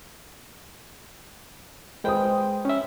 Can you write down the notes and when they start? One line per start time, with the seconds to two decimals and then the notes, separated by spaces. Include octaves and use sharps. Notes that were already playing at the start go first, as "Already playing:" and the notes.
2.04 G#3 B4 C5 G5 D#6
2.65 C#4 E5